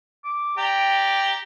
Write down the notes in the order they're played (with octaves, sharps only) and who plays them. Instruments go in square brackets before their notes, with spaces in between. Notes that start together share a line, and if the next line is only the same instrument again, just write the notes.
[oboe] D6
[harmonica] G4 D5 A#5 [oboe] G5